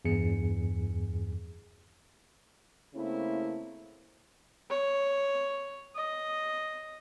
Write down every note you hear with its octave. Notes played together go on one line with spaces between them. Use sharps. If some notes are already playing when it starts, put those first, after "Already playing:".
E2 G2 G#4 C#7
C#3 A3 A#3 C4 E4
C#5
D#5